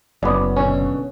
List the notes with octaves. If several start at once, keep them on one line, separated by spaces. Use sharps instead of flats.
F#1 B3 C#4 D5
B2 D3 C#4